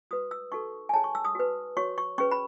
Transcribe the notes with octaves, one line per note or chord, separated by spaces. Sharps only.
F#4 B4 D#6
E6
D#4 F#4 A4 C#6
G#5
D#4 G#4 C#5 A5
C#6
E6
D#6
F#4 B4
F#4 C#5 C#6
C#6
C#4 G#4 B4 C#6
B5